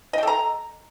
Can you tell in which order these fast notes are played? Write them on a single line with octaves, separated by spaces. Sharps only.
D#5 G5 A4 A#5